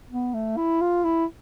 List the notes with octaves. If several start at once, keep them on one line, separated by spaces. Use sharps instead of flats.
B3
A3
E4
F4
E4